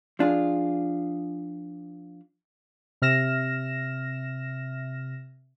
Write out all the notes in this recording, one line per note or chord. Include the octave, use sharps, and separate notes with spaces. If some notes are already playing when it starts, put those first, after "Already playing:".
F3 D4 F4 G#4
C3 E5 F6 A#6 E7